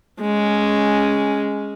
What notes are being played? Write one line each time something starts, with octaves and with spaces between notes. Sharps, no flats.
G#3 C#4